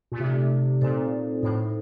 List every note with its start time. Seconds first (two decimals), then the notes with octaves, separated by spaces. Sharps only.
0.12 A#2
0.19 C3 A3 D#4 A4 D5
0.81 A#2 C4 D#4 A4 C5
1.43 A2 D#4 A4 C5